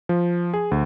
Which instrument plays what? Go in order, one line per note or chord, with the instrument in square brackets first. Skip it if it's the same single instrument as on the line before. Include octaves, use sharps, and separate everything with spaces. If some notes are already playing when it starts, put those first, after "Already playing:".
[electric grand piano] F3
G#4
D2